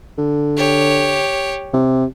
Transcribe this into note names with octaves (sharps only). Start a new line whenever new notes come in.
D3
G4 C#5
C3